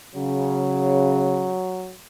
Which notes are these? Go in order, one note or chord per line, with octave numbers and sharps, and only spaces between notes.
C#3 F#3